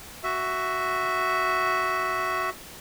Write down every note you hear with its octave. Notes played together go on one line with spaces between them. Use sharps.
F#4 E5